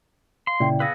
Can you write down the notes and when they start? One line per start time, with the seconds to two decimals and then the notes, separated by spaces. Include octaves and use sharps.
0.47 F5 C6
0.60 A#2 C#3 E4 D5 G5
0.80 B3 G#4 B4 F5 E6 A#6